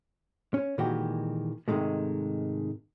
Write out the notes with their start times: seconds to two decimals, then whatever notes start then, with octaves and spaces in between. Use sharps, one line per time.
0.54 C#4
0.78 A#2 D#3 E3 G#3 F#4 G4
1.68 G#2 C3 D#3 G#3 A3